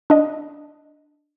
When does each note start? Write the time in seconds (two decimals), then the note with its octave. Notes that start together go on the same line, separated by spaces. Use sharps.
0.10 D4 D#5